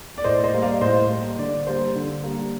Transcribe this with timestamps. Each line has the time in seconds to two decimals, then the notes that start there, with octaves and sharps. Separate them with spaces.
0.18 D5
0.24 A2 C5 D#5
0.44 C5 D#5
0.54 G3 A#3
0.62 D5 F5
0.81 A2 C5 D#5
1.09 G3 A#3
1.38 D3 D5
1.67 G3 A#3 C5
1.95 D3
2.24 G3 A#3